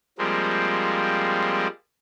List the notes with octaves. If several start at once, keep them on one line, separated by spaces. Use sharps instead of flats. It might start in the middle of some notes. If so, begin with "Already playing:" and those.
F3 G3 G#3 A#3 C4